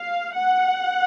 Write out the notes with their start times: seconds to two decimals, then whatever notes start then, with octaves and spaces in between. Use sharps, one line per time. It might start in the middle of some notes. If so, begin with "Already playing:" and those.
Already playing: F5
0.35 F#5